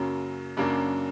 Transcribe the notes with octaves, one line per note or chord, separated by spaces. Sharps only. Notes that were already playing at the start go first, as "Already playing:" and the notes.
Already playing: F#2 C#3 F#3 A#3
F#2 C#3 F#3 A#3 D4